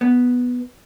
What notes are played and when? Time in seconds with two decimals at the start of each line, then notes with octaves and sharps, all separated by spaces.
0.01 B3